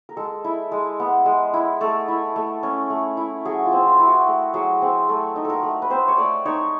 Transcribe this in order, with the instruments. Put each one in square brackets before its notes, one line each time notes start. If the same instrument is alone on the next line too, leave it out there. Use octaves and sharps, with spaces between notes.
[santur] A#4
G#3 A4
E4
G#3
B3
G#3
E4
A3 A4
E4
A3
C#4
A3
E4
F#3 G#4
F4
C4
F4
E4
F#4
A3
F#3 G#4
C4 G#4
A3 A4
D#4
A4
A#4
A3
B4
C4 C5
C#5
A3 D5
D#4 C#5